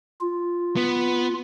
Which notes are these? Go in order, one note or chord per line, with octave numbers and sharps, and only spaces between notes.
F4
B3